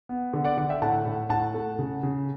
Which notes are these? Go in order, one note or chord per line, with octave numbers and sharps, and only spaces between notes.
B3
D3
D5 F#5
D3 D5 F#5
E5 G5
A2 F#5 A5
A2
A2 F#5 A5
A3
C#3
C#3